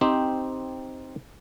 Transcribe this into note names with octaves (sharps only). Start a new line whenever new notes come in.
C4 D#4 G4 C5